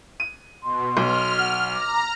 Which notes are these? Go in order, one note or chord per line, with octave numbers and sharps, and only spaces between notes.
D#7
B2 C6
B1 F6
F#5
A#5 D6